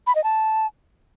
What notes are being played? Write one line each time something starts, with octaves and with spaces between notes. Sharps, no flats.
B5
D#5
A5